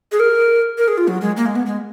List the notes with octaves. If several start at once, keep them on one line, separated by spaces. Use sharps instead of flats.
G#4
A#4
A#4
G#4
F4
F#3
G#3
A#3
G#3
B3
G#3